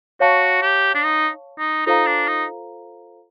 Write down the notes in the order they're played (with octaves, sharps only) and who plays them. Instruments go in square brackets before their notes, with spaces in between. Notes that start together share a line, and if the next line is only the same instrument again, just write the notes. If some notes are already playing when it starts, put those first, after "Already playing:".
[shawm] F#4 [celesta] C#5 F5 A5 C#6
[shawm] G4
D4
D#4
D#4
[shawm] D#4 [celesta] F4 A4 C5 F5 A#5
[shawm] D4
D#4